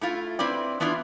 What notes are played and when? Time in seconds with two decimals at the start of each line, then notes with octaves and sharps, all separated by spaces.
0.01 A3 E4 F4
0.39 C4 E4 B4 D5
0.80 E3 B3 D4 E4 F4